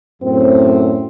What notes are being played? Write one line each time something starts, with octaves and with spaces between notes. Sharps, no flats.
F#2 A2 C4